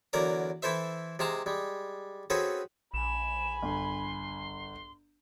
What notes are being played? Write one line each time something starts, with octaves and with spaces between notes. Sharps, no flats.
E2 D3 F#3 A#4 D5 A#5
E3 E4 A4 C5 E5
C3 G#3 F5 A5 A#5
G3 G#3
C4 C#4 F#4 G#4 A4 B4
A#1 G#5 B5 E7
G1 C6